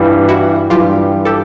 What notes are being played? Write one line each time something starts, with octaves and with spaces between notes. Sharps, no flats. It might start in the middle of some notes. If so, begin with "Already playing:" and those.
Already playing: G2 E3 G3 D#4 F4
E4 F#4
G2 E3 G3 F4 G4
G4 A4